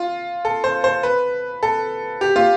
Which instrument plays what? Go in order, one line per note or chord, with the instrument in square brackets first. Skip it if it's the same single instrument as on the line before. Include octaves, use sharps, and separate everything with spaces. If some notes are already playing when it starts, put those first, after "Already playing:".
Already playing: [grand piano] F4
A4
C5
C5
B4
A4
G4
F4